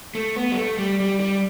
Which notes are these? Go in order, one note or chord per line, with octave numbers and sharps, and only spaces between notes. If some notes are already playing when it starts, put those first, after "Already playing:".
A3
B3
G3
A3
G3
G3
G3